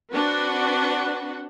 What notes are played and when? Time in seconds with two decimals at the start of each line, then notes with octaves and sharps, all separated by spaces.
0.12 C4 D4 F#4 B4 F#5